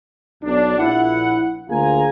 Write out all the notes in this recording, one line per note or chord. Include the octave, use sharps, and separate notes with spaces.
B1 D4
A#1 E4 F#5
D2 A#3 F4 G#4 G#5 A#5